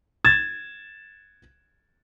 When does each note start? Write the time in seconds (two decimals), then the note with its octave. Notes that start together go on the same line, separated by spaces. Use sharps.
0.25 G#6 A6 E7